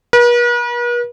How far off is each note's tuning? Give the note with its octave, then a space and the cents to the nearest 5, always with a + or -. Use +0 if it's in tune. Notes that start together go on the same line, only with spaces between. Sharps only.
B4 -45